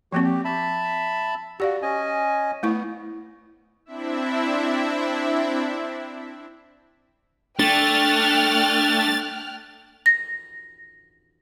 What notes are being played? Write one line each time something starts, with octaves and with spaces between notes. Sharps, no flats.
F3 A#3 C4 F#4 G4 C#5
G4
E5 A5 B5
F#4 G4 D5 F5
C#4 D#5 G#5
A3 B3 E4 C#6
C4 D4 E4 E5
A3 D4 G5 F6 F#6 A6
A#6